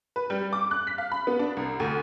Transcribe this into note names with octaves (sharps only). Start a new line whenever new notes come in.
B4
G3
D6
F#6
B6
F5
B5
B3
D4
C2
D2